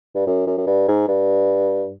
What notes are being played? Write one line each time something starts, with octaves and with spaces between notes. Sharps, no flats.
G2
F#2
F#2
F#2
G2
G#2
G2